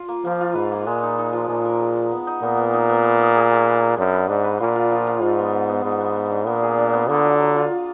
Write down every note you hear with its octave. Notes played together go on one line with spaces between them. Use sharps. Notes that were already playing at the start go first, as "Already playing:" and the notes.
Already playing: F4
A#3
F3 A#3
F4
G#2 B4
A#3
A#2 G#3
D#4
D#4
F3
A#2 G#3
A#4
G#3
D#4
B3
D#4
A#2 B3
B3
D#4
B3
B3
D#4
G#4
G#3
B4
G#4
F#2 D4
B4
G#2 D4
B4
A#2 F4
F4
F3
F4
G#2 F4
B3
B3
B3
G#2 B3
B3
B3
D4
A#2 B3
G#4
D4
B3
D3 A#3
F#3
F#3
F4
F4